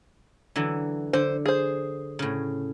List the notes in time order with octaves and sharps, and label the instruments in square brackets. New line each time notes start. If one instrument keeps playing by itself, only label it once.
[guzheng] D3 E3 F#3
[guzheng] D3 [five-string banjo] C5
[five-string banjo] G#4 C5
[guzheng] A2 C#3